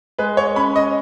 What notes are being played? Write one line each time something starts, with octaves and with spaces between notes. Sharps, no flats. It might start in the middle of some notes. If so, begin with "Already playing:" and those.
G#3 B4
C#5
C#4 B5
D#5